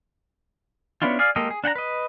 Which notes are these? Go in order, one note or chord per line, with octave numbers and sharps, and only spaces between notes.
B3 C#4 D4 E4 F4
G#4 D5 F5
G#3 A#3 G4 A4 D#5
G#4
D4 F#5 G5 A#5
B4 D#5